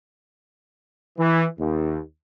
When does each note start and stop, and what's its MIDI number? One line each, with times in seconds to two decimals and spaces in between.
1.19 1.45 52
1.58 1.99 39